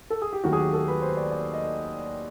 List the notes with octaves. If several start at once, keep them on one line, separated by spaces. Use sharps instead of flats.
A4
G#4
G4
D#2 D#3 F#3 A3 F#4
G#4
G4
A4
B4
C5
D5
D5
D#5